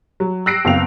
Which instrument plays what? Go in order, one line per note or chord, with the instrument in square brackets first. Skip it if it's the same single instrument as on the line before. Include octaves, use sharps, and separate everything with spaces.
[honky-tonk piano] F#3
E6 F#6 A#6 C7 D7
F#1 B3 C4 F5 F7